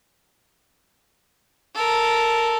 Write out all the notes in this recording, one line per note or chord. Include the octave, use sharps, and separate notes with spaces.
A4 A#4